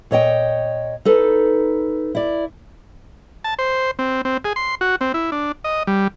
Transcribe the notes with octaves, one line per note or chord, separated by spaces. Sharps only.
A#2 C#5 D#5 G5
D#4 A4 B4
E4 D5
A5
C5
C4
C4
G#4
C6
F#4
C4
E4
D4
D#5
G3